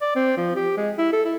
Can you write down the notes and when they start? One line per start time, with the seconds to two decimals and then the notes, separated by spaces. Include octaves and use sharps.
0.01 D5
0.15 C4
0.37 F3
0.55 G4
0.77 G#3
0.98 E4
1.13 A4
1.25 E4